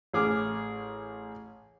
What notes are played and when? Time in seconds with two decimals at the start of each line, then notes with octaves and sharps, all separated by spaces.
0.13 A1 G#4 D6 F6